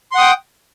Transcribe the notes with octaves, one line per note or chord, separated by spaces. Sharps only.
F#5 G5 C6 D#6